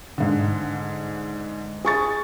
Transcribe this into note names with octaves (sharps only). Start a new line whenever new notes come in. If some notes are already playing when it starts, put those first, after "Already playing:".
G#2 D3
G#4 C#6 A6